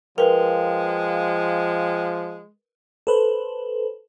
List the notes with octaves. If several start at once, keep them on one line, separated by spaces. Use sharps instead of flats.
F3 G#3 A#4 B4 F5 G5
A4 B4 C5